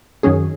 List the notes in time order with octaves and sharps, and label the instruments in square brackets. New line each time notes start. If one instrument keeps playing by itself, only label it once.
[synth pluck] F#2 D#3 F#3 C#4 G#4